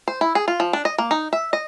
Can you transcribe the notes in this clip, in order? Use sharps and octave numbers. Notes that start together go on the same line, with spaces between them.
C5
E4
G#4
F4
F3
D4
D#5
A#3
D#4
E5
D#5